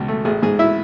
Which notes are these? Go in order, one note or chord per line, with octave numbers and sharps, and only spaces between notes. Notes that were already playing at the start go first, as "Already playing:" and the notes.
Already playing: C#2 B2
A3
A1 G#4
G#2 G#4
E4 E5